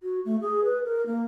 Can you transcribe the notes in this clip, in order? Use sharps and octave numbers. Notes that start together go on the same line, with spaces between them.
F#4
A3
G#4
B4
A#4
A#3